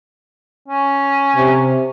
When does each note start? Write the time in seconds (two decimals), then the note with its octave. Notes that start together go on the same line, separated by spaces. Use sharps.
0.68 C#4
1.36 C3